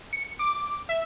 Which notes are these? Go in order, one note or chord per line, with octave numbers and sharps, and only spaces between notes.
C#7
D6
E5